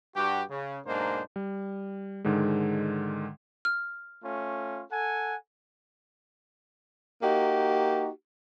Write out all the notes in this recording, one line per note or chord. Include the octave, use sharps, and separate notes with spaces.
G2 F#4 G4
C#3
B1 G#2 A#3 D4 D#4 C5
G3
G#2 D3 D#3 G#3
F6
A3 C#4 F4
A4 F#5 G#5
A#3 D#4 F#4 G4